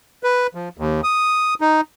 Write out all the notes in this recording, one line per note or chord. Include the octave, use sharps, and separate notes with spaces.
B4
F3
D#2
D#6
D#4